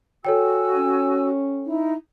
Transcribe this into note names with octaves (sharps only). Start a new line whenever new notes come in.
F#4 A4 C#5 G5 G#5 E6
C#4
D#4 E4